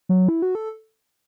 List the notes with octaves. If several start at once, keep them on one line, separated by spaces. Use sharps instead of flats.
F#3
E4
F#4
A4